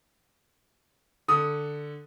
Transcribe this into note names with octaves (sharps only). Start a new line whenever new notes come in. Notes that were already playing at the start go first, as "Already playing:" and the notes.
D3 D#6